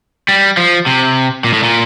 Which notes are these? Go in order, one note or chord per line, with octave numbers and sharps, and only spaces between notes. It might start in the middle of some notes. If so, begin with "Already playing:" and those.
G3
F3
C3
A#2
A2
A#2